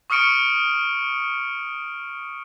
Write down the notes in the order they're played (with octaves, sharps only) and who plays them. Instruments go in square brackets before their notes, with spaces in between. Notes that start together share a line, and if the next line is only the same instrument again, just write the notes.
[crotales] C#6 D#6 F6 C#7 D7